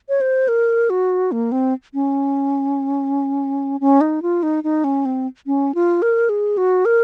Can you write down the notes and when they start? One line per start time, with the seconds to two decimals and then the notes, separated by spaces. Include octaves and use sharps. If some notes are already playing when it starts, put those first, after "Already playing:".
0.09 C#5
0.21 C5
0.48 A#4
0.90 F#4
1.32 A#3
1.52 C4
1.94 C#4
3.80 C#4
4.01 D#4
4.22 F4
4.43 D#4
4.64 D#4
4.84 C#4
5.05 C4
5.46 C#4
5.75 F4
6.02 A#4
6.29 G#4
6.57 F#4
6.85 A#4